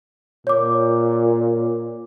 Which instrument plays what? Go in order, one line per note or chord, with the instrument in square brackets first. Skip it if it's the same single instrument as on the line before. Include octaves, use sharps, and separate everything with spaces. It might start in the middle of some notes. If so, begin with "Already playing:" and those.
[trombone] A#2 [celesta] C#5 D6